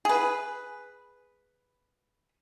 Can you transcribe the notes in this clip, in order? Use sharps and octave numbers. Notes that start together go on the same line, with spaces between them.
G#4 B4